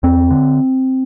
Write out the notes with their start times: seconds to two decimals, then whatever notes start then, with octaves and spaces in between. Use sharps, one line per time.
0.03 E2 C4
0.31 D3